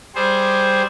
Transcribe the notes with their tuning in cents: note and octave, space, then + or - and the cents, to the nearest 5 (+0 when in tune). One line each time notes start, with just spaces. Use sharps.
G3 +0 G#4 +0 C5 +0